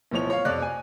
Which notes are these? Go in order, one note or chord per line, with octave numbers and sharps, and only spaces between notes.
D1 B2 F3 C#5 F7
C#5 F5
F2 C3 D5 F#6
G#5